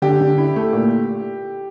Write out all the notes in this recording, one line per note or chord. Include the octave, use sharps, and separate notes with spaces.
D3 G4
D3
E4
A3
A#2